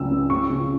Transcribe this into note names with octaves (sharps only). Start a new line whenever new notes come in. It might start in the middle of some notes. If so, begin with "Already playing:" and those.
Already playing: C#2 C#3 F#3 E6
C#3
C#3 C#6
C#3